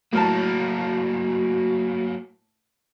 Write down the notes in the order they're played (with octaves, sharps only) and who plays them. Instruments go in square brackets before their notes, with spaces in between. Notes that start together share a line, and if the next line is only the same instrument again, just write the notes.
[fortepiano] A2 A#4 A5 [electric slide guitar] F#3 A#3 [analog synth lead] F#4